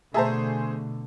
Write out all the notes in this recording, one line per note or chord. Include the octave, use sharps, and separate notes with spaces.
B2 D3 A3 G#4 C5 E5 A5 A#5